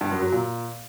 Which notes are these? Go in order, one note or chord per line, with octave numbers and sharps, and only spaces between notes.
G2
F#2
F#3
A#2